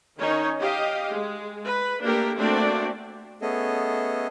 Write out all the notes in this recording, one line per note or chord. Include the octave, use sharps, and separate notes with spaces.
D#3 C#4 D#4 C#5
G4 D#5 F5
G#3
B4
A3 A#3 D4 G4 A4 A#4
A3 A#3 C4 D4 F#4 D5
A3 B3 C#4 G#4 A4 D#5